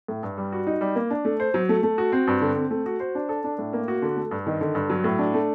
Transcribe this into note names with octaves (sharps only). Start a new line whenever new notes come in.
A2
G2
G3
F#4
D#4
G3
A#3
D4
A3
C5
F#3
A3
A3
F#4
C4
G2
D3
C4
A3
F#4
C5
D4
A4
D4
A2
A#3
F#4
D3
A3
G2
D#3
D3
G2
F#3
A2
D4
A3